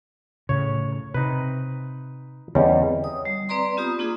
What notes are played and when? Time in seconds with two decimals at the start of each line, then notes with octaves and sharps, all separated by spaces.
0.49 A2 C#3 C#5
1.14 C3 D#4 B4
2.55 E2 D3 G3 C4 C#4 C#5 D#5
3.04 D#6
3.25 G3
3.49 C4 B4 D5 A#5 C6
3.77 B3 F4 G4 D#6
3.99 A#3 D4 F4 G#4